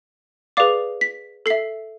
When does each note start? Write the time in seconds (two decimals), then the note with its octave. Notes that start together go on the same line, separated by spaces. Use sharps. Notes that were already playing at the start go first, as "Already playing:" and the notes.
0.57 G#4 B4 D5 F5 D6
1.01 B6
1.46 A4 E5 C7